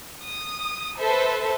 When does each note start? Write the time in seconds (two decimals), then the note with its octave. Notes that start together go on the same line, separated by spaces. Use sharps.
0.24 D#6
0.99 A4 B4 C5 E5